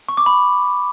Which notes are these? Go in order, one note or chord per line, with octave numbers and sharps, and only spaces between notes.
C#6
D6
B5